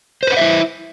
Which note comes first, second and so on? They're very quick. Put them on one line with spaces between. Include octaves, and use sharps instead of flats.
C5 B4 F#5 E5 E4